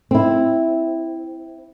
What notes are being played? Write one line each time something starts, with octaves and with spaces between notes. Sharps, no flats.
C4 E4